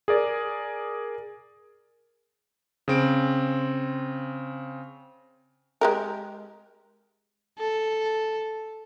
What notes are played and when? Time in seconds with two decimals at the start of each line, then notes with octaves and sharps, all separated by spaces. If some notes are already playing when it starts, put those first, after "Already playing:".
0.08 G#4 A#4 D5
2.88 C#3 C4 D7
5.81 G#3 G4 A#4
7.59 A4